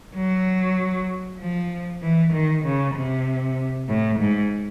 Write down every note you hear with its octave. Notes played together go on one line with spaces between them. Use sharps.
F#3
F3
E3
D#3
C#3
C3
A2
G#2